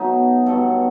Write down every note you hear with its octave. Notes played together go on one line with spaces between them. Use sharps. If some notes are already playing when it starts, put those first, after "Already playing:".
Already playing: B2 F#3 A3 D#4
G2 F#3 B3 A4